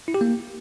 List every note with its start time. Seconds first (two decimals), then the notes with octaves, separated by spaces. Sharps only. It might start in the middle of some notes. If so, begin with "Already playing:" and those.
0.08 E4
0.14 G4
0.21 A#3